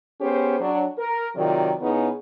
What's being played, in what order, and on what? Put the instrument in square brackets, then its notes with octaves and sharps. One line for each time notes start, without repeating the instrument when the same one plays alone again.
[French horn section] B3 C#4 G4 G#4 C5
F#3 D4
A#4
C3 D#3 F#3 F4 D5
C#3 B3 D#4 E4 G#4